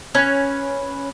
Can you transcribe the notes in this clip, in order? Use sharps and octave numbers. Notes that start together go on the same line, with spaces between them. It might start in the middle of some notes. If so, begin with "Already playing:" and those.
C#4 B4